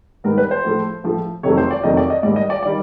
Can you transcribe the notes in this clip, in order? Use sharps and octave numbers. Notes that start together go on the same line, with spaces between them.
G#2 D#3 G3 B3 A#4
B4
C5
A2 F3 A3
A2 F3 A3
F2 C3 D#3 F#3 A3 C#5
C5
D5
F2 C3 D#3 F#3 A3 D#5
D5
D#5
G#2 D#3 G3 D5
D#5
D5
D#3 G3 D5